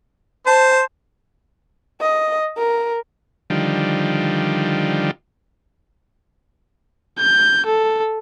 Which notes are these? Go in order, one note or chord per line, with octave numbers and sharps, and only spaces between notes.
C5 A5
D#5
A#4
D3 D#3 F3 G3
G6
A4